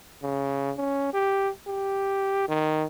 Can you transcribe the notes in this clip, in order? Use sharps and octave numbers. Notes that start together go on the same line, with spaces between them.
C#3
C#4
G4
G4
D#3